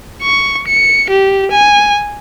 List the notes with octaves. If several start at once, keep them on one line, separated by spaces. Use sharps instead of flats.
C#6
C#7
G4
G#5